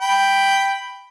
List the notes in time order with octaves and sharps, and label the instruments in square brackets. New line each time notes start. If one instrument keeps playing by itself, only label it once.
[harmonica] G5 B5